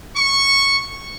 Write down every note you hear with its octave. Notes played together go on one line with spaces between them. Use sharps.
C#6